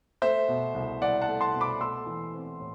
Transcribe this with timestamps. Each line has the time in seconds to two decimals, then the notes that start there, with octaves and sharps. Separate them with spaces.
0.22 A3 C5 E5
0.48 B2
0.74 C2
1.01 C2 D5 F#5
1.21 F#5 A5
1.28 A3
1.41 A5 C6
1.53 B2
1.61 B5 D6
1.81 A3 C6 E6
2.06 E3
2.34 C4
2.59 A2